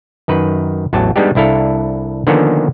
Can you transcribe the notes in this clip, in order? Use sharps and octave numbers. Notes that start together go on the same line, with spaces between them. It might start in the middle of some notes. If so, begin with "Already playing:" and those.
F#2 D#3 B4
A1 E2 F#3 A5
G3 G#3 B3 D4 D#4 G4
C2 D4 E4 A4 F5
D3 D#3 F3 A#3 B3 C#4